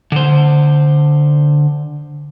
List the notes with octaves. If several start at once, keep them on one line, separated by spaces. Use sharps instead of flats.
D3 C5